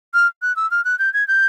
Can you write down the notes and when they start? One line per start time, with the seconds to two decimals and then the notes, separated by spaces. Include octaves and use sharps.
0.14 F6
0.42 F#6
0.56 E6
0.71 F6
0.85 F#6
0.99 G6
1.14 G#6
1.28 G6